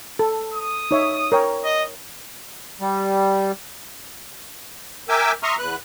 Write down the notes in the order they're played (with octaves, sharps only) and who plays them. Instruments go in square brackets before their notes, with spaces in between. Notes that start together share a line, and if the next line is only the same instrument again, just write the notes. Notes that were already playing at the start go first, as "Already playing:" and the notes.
[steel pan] A4
[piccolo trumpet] D#6
[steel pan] D#4 C#5 E5
A#4 C#5 G5
[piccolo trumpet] D#5
[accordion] G3
A#4 E5 G5 G#5 D6 E6
E5 A#5 C6 C#6 D#6 F6
E2 B4 F#6